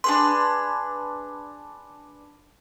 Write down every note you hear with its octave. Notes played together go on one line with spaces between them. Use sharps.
D4 G#4 B4 C6